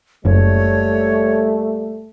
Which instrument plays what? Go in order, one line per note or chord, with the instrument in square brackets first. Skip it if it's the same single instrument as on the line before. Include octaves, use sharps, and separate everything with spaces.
[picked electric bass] F#1 [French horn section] A#2 G3 A3 [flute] C#5